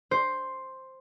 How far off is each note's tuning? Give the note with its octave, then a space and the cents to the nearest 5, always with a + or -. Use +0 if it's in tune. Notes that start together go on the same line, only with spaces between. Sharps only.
C5 +5